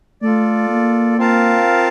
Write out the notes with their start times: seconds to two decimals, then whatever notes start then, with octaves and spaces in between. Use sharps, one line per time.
0.22 A3 F4 A4 D5
0.69 A#3
1.18 C4 F4 A#4 F5 A5